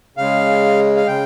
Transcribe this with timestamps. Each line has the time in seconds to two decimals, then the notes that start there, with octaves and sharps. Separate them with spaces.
0.17 C#3 G#3 F5
0.96 F5
1.07 C#3 G5